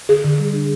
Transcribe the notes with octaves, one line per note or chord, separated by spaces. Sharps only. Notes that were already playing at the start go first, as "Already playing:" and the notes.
D3 G#4
D3
G3
D4